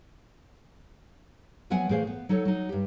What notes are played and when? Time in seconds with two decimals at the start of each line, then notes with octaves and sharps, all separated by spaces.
1.70 F3 F#3 B3 A#4 F#5 G#5
1.89 A2 E3 G#4 C5 F5
2.07 B3
2.29 F#3 D#4 A4 C#5
2.45 F#3 D#4
2.69 G2 G4